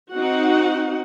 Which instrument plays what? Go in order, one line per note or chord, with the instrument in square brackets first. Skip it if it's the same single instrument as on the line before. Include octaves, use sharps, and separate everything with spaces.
[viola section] C4 D#4 F#4 F#5